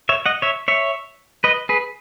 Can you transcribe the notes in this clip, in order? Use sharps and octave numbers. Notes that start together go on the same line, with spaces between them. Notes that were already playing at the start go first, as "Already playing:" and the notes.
C#5 E5
D#5 F#5
C#5 E5
C#5 E5
B4 D#5
G#4 B4